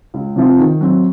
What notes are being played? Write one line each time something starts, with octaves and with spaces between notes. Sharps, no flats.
C#2
C3 F3 C4 F4
D#3
F#3 C4